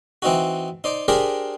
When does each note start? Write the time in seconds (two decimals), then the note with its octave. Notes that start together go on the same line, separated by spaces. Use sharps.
0.22 E3 C4 D#4 F#4
0.84 D#4 C5 D5
1.08 D4 G4 G#4 A#4 C5 D5